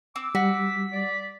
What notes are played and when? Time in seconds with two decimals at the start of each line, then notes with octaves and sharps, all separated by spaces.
0.16 C4 D6 E6
0.35 G3 F#4 B6
0.93 D5